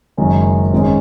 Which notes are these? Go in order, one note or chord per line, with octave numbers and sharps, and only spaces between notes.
F#1 F#2 D#3 G#3 C#4
G#1 G#2 G#3 C#4